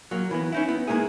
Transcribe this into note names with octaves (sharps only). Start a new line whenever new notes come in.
F#3 A#3
E3 B3
C#4 D#4 E4
B3
G#3 A#3 D#4 E4 G#4